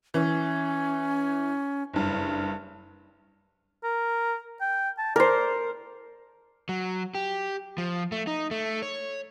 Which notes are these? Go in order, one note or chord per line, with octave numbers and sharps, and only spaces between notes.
E3 C#4
F#1 G2
A#4
G5
A5
A#4 C5 D5
F#3
G4
F3
A3
D#4
A3
C#5